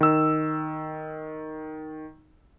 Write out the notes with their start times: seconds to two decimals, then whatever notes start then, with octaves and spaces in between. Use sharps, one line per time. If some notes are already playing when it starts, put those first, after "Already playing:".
0.01 D#3 E6